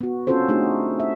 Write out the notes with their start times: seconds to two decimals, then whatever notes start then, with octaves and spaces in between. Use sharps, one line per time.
0.01 B3 F#4
0.27 C4 C#4 F4 F#4 A4 C5
0.48 A3 D4 D#4 F#4 G#4
1.00 E5